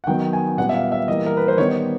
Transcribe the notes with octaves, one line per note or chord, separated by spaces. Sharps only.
F#5
D#3 F#3 B3 G5
G#5
A#2 G3 B3 F#5
E5
F5
E5
E3 G3 A#3 D#5
A#4
B4
C5
D#3 G3 B3 D#4 C#5